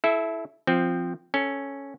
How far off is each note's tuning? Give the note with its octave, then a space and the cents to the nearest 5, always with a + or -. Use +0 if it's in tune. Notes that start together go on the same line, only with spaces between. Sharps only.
E4 +0 A4 -30 E5 +0
F3 +0 C4 +0
C#4 +0 A4 +0